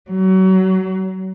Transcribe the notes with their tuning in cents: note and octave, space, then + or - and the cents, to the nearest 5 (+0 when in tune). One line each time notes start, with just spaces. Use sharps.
F#3 +30